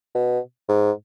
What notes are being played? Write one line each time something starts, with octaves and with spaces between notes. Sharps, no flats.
B2
G#2